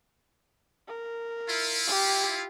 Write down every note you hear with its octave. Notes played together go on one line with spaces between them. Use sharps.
A#4
E4 F4
G4